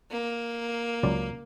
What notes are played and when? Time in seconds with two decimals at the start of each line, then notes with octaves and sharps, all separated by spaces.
0.11 A#3
1.03 C#2 F#3 D5